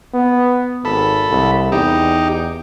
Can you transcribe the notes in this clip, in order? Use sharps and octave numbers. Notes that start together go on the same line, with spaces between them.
B3
G#1 A4 B5
C2
E2 D#4 G4